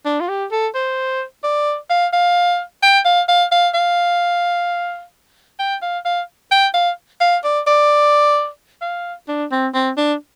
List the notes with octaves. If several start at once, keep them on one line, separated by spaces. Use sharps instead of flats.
D4
F4
G4
A4
C5
D5
F5
F5
G5
F5
F5
F5
F5
G5
F5
F5
G5
F5
F5
D5
D5
F5
D4
C4
C4
D4